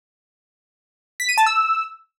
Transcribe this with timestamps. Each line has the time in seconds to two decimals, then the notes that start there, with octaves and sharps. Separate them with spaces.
1.20 B6
1.29 D#7
1.38 A5
1.46 E6